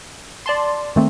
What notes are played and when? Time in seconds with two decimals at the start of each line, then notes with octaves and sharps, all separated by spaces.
0.46 D5 A5 C6
0.96 D#3 A3 C4